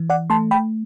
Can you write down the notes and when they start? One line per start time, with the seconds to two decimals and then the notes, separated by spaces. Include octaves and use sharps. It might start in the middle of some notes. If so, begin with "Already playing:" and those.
Already playing: E3
0.10 D5 F#5
0.30 A3 A5 C6
0.51 G5 B5